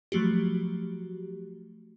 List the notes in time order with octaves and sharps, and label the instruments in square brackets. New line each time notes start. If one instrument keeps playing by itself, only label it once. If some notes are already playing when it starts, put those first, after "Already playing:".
[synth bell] F3 F#3 A3 F#4 G4